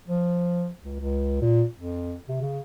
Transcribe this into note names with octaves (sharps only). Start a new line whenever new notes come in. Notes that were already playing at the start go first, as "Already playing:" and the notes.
F3
C#2
C#2
A#2
F2
C3
C#3